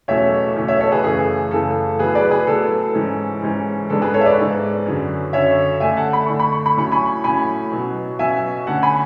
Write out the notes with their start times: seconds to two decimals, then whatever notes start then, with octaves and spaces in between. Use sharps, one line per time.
0.08 E2 B2 F#3 A3 C#4 C#5 E5
0.56 E2 B2 F#3 A3 C#4
0.68 C#5 E5
0.80 A4 C#5
0.92 G#4 B4
1.04 F#2 C#3 E3 A3 G#4
1.51 F#2 C#3 E3 A3 A4
1.99 A2 F#3 B3 G#4 B4
2.15 B4 D5
2.31 G#4 B4
2.47 A2 F#3 B3 A4
2.95 G#2 E3 G#3 C#4
3.43 G#2 E3 G#3 C#4
3.90 G#2 G#3 B3 D4 A4
4.02 G#4 B4
4.14 A4 C#5
4.21 E5
4.26 B4 D5
4.38 G#2 G#3 B3 D4
4.86 F#2 D3 F#3 C#4
5.33 F#2 D3 F#3 C#4 C#5 E5
5.80 D3 A3 D4 E5 G#5
5.97 F#5 A5
6.13 B5
6.26 D3 A3 D4 C#6
6.39 B5
6.52 C#6
6.66 B5
6.77 A2 F#3 C#4 C#6
6.92 G#5 B5
7.24 A2 F#3 C#4 G#5 B5
7.72 B2 F#3 C#4
8.19 B2 F#3 C#4 E5 G#5
8.67 D3 A3 C#4 F#5 A5
8.83 G#5 B5